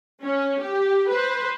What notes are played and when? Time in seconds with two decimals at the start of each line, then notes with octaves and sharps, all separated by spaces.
0.22 C#4
0.60 G4
1.09 B4 C5